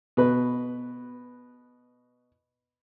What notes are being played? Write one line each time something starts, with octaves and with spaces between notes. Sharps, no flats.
B2 B4